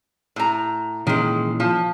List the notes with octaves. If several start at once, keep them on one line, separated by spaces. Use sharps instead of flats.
A2 A#5
A#2 D#3 E3 G#3 C#4
F3